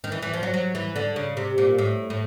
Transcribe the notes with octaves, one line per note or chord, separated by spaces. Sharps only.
D#3
E3
E3
F3
F#3
F#3
E3
D3
C#3
C3
A#2
A2
A2